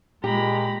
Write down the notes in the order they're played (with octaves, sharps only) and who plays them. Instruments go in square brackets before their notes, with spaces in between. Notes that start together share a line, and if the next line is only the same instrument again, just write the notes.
[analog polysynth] A#2 [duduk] G#3 [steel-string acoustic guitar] G4 [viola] A#5 B5